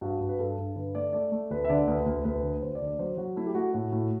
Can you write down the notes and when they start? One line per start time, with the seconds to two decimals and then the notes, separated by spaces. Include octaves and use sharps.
0.01 G2 F#4
0.20 G2
0.29 B4
0.39 G2 A4
0.58 G2
0.76 D3 B4
0.95 A3 D5
1.13 A3 D5
1.32 A3
1.50 D2 B4
1.65 E5
1.69 D3 D5
1.87 D2 B4
2.06 D2
2.24 D2 B4
2.43 D3
2.62 D2 C5
2.75 D5
2.81 D3
2.88 D5
2.99 F#3 C5
3.17 F#3 F#4
3.36 A3 E4
3.47 G4
3.55 A3 F#4
3.73 A2 F#4
3.92 A2